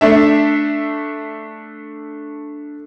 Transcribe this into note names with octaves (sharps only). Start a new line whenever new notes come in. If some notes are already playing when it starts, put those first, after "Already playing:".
A3 D4 E5